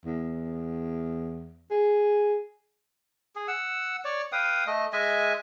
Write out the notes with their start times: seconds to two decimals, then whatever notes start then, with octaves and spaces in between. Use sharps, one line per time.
0.05 E2
1.71 G#4
3.36 G#4
3.48 F#5 E6
4.04 C#5 D5
4.32 B4 F5 G5 D#6
4.67 A3 D#5
4.93 G#3 D#5 E5 G#5